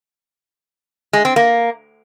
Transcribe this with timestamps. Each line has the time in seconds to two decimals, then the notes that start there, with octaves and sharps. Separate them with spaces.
1.13 G#3
1.25 C4
1.36 A#3